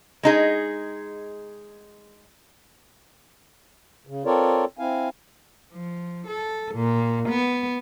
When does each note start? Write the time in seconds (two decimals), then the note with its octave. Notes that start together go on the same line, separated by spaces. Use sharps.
0.23 G#3 D#4 G#4
4.07 C#3
4.26 C4 F4 A4 A#4 C#5 D5
4.79 C4 E4 F5 G#5
5.73 F3
6.28 A4
6.75 A#2
7.29 B3